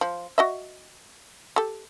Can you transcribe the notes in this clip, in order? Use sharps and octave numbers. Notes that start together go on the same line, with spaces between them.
F3
F#4 D#5 E5
G4 A4